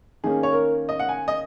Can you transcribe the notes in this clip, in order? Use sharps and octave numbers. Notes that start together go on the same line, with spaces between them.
D#3 A#3 C#4 G#4
C#5
A#4
D#5
F#5
G#5
D#5